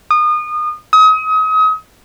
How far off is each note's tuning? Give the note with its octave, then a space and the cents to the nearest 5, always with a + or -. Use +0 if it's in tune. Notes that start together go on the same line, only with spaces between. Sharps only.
D#6 -30
D#6 +35